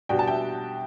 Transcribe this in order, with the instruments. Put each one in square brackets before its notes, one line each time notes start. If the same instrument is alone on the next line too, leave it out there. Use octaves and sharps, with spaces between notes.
[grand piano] B2 G3 D4 F#4 [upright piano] G5
[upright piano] A5
E5 G5